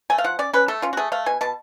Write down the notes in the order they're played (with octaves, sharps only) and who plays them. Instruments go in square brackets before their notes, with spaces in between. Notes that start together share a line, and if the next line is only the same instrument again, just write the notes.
[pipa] A3 G#5
F5
F3 F#5
C#4 D5
C#4 B4
A3 A4
C#4 F4
F#4
A3 G#4
A3 F5
B2 G#5
B2 A5